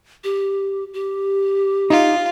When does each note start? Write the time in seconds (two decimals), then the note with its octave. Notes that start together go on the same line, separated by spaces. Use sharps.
0.24 G4
0.94 G4
1.90 D#4 F4